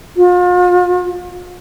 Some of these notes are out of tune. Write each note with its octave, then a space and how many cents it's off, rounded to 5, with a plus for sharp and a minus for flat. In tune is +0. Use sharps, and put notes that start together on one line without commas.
F4 +40